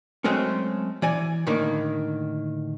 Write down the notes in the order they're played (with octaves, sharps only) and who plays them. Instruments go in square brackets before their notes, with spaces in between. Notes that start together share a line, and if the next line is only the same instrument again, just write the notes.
[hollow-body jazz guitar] F#3 G#3 A3 C4 C#4
E3 D5 G#5
A2 D3 D#3 A#3